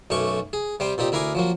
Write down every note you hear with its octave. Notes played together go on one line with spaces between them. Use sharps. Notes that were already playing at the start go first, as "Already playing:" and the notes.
B1 F#2 A3 C#4 C#6 D6
G#4
C3 G3 C5 G5
A#2 C4 D#4 G4
D2 E4 A#4 F5 G#5 D6
F3 F#3 A#3